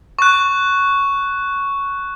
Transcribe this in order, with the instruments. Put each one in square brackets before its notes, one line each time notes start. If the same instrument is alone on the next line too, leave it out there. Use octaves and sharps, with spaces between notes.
[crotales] C#6 F#6